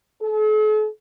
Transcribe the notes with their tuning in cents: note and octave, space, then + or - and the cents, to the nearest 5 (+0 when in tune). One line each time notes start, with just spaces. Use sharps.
A4 -45